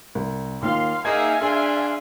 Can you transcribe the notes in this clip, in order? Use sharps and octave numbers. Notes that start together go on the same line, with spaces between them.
C2
D#2 A#3 F4 F5 C6
A#3 D#4 G#4 E5 F5 G#5 G#6
D4 G#4 C6